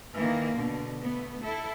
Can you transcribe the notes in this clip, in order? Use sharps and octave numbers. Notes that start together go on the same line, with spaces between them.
D#3 E3 A#3
B2 D3
A3 B3
E4 A4